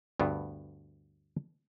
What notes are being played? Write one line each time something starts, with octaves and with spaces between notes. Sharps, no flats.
D2 G2 B3